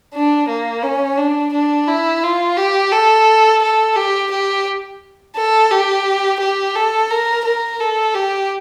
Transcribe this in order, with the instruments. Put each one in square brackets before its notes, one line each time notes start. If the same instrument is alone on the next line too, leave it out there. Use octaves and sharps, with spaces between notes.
[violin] D4
A#3
C#4
D4
D4
E4
F4
G4
A4
A4
G4
G4
A4
G4
G4
A4
A#4
A#4
A4
G4